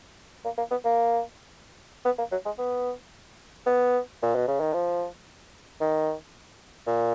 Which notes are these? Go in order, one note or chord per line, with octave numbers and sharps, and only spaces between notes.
A#3
A#3
B3
A#3
B3
A#3
F#3
G#3
B3
B3
A#2
B2
C#3
D#3
F3
D#3
A#2